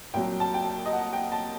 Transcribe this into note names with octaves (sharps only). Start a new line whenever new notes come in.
C2 A#2 F#3 G5
A5
G5
D#5
F#5
G5
A5